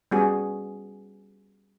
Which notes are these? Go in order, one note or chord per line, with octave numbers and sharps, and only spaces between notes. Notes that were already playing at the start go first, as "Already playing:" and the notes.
G3 B3 C#4 F#4 G#4